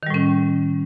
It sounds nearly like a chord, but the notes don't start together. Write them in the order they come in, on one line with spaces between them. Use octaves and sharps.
D#3 G3 A2 C#4